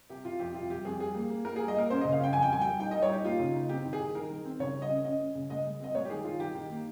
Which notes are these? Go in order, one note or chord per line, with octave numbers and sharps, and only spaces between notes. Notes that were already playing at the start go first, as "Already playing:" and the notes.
C3 G4
C3 F4
F2 G4
C3 F4
G3 G4
F2 G#4
G3 G#4
A#3
A#3
A#3 A#4
G3 G#4
D#5
A#3 A#4
C#4 C5
C#3 D#5
F5
C#4 G5
F2 G#5
G5
G3 G#5
G3 G5
D#4 G5
G3 D#5
C#5
D#4 G4
A#3 F4
C#3
D#4
C4 G4
D#3
G#4
D#3
D#3 A#4
D#3
C4
C#3 C#5
G3
D#5
C#4
C#4 D#5
C#4
C#3
G#3 D#5
G#3
C4 D#5
G#3 C#5
G4
D#3 G#4
D#3 F4
D#3 G4
D#3
A#3